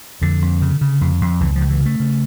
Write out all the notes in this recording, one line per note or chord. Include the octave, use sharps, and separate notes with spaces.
F2 D3
F2
C#3
C#3
F2
F2
C#2 E3
F3
C#2
E3
C#3
A3
C#3